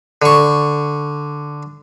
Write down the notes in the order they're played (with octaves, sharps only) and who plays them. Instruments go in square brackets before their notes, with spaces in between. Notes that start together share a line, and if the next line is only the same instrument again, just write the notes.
[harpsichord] D3 C#6